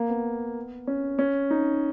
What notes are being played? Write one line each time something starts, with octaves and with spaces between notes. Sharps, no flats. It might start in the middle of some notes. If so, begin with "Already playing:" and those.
Already playing: A#3
B3
C#4
C#4
D#4